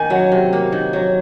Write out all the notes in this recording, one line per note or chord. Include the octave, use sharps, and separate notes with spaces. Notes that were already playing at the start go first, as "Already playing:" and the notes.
Already playing: D#3 A#3 G#5
F#3 F#5
C3
A#3
D#3
F#3